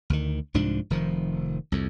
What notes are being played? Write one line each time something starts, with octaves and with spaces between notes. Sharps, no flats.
D2 D#3
C2 G#2 F3 D4
F1 D#3 F3
C2 F2